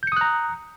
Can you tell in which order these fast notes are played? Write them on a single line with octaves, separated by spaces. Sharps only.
G6 C#7 D#6 F#6 A#5